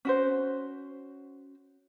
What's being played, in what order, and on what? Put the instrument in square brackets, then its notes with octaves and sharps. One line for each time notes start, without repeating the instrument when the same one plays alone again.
[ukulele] C#4 F#4 C5